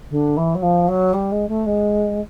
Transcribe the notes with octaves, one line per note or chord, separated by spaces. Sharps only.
D3
E3
F#3
F3
F#3
G3
G#3
A3
G#3